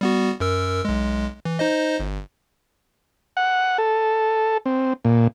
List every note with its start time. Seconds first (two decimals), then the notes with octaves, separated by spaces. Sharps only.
0.01 G3 B3 F#4
0.40 F#2 A#4 E6
0.85 B1 G#3
1.45 E3
1.59 D#4 C5 D#5
2.00 G1
3.37 F#5
3.78 A4
4.66 C4
5.05 A#2